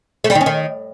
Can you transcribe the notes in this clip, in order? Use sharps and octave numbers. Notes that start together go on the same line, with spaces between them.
A3
G3
D#3
C#4
D#3